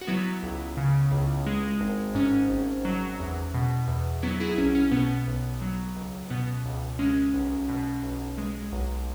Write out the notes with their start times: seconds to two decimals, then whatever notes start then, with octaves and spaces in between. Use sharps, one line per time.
0.01 F#4
0.07 F#3 B3 E4
0.43 C#2
0.77 C#3
1.12 C#2
1.46 G#3
1.81 G#1
2.15 G#2 C#4
2.50 G#1
2.85 F#3
3.19 E2
3.54 B2
3.88 E2
4.23 F#3 B3 E4
4.40 E4 G#4
4.57 B1 C#4
4.75 C#4
4.91 B2 B3
5.27 B1
5.62 F#3
5.96 C#2
6.30 B2 B3
6.65 C#2
6.99 G#3 C#4
7.34 B1
7.69 B2
8.03 B1
8.38 G#3
8.72 B1